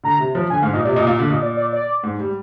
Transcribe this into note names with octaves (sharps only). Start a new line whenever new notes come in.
D3 A#5
C3
F3
D3 G#5
G#2 F5
A#2 D#5
C3 D5
A#2 D#5
A#2 F5
D3 F5
A#2 D#5
D5
D5
D5
G#2
G3